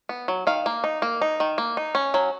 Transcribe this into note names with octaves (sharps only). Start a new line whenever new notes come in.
B3
F#3
D#3 F5
A#3
D#4
A#3
D#4
D#3
A#3
D#4
C#4
F#3